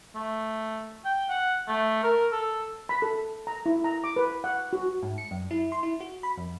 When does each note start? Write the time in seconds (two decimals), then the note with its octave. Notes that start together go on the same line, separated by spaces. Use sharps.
0.15 A3
1.05 G5
1.30 F#5
1.68 A3
2.03 A#4
2.32 A4
2.89 B5
3.02 A4
3.47 A#5
3.66 E4
3.84 A#5
4.04 D6
4.16 B4
4.44 F#5
4.73 F#4
5.03 G#2
5.18 C#7
5.31 F#2
5.51 E4
5.72 C6
5.83 E4
6.01 F#4
6.23 B5
6.37 F2